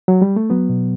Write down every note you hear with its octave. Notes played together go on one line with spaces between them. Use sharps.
F#3
G3
A3
F#3 B3
B2